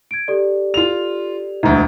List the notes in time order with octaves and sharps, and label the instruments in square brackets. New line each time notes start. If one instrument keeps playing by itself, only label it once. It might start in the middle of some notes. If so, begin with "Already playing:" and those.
[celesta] G#6 D7
G4 A4 D5
[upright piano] F4 F7
[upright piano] E1 D2 [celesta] A#5